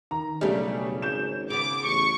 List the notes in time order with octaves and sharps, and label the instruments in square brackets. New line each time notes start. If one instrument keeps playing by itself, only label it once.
[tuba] D#3 [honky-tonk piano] A#5
[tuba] B1 [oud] C#3 C#4 [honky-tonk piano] G3 A3 D4
[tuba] G#1 [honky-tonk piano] G6 E7
[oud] C#3 B3 [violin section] D6
[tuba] A1 [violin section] C#6